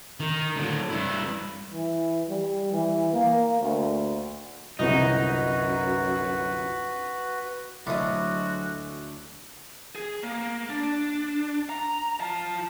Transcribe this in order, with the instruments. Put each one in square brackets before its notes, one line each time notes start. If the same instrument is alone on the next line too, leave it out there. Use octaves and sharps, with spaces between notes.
[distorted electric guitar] D#3
D3 F#3
G2 E4
[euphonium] E3
G3
E3
A#3
D2
[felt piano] G1 C2 [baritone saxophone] F#2 [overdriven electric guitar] D#4 [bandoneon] F#4 B4
[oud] D2 D#5 [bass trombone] F#3 [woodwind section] G#3 F#4 [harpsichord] C#4 D4 E4
[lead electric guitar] G#4
A#3
D4
A#5
F4 A5